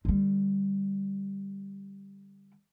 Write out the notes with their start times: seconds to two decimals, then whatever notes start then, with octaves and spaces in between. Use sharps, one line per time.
0.05 D3 G3